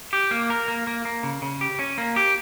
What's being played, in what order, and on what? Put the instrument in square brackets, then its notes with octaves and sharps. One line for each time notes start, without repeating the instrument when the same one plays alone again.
[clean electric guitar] G4
A#3
A#4
A#3
A#3
A#3
C#3
C#3
G4
C#4
A#3
G4